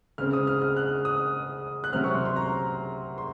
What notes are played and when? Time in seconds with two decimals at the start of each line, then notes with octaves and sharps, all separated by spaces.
0.18 C#3 G#3 C4 F6
0.33 D#6
0.47 F6
0.62 F6
0.77 F#6
1.05 D#6
1.84 F#6
1.93 C3 F#3 C4 F6
2.04 C#6
2.14 C6
2.25 C6
2.36 A#5
3.18 C6